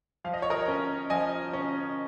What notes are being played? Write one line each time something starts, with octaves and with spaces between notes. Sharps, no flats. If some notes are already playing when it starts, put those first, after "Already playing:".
F3 F5
D#5
C#5
A#4 D#5
C#4
F3 D#5 G#5
C#4